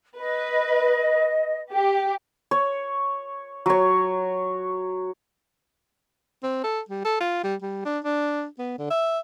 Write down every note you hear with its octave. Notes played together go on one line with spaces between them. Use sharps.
B4 D#5
G4
C#5
F#3 C#5
C4
A4
G3
A4
F4
G3
G3
D4
D4
B3
D3
E5